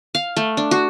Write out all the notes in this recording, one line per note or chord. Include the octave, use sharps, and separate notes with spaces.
F5
A3
D4
F#4